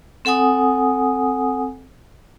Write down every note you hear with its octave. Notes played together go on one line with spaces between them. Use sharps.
C4 A4 F#5 G#5 D#6